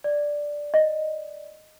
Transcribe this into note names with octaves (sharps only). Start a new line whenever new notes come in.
D5
D#5